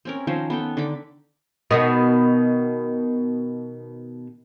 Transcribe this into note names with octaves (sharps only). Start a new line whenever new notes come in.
C4 C#4 A#4
D#3 F3 C#4 C5
B3 A4 G5
D3 D#4 B5 D6
B2 D#3 B3